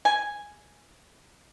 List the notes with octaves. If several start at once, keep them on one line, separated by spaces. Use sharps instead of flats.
G#5